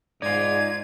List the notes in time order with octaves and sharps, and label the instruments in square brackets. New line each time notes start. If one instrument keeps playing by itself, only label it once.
[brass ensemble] G#2 [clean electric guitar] D#4 F4 [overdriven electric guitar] D5 [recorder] G#6